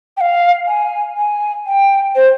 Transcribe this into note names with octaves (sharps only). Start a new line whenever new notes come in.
G5
F5
G#5
G#5
G5
C5